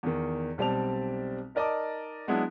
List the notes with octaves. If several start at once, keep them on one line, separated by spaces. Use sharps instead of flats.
E2 D#3
B1 G3 C4 D5 A5 F7
D#4 A#4 D5 D#5 A5 D6
F#3 G#3 B3 D4 E4